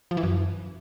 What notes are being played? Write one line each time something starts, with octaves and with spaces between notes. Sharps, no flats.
F3
E3
F#2